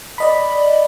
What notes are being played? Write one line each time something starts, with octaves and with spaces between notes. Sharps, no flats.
D5 D#5 B5